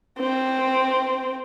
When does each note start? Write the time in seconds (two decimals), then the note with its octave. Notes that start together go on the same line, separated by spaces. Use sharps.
0.19 C4